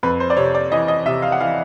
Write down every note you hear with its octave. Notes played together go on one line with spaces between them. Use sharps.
F2 B4
C5
D5
C3 C#5
D5
E3 D#5
D#5
C3 E5
F5
F#5
E3 F5